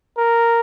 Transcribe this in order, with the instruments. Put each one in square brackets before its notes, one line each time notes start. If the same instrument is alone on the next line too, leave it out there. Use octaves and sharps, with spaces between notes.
[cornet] A#4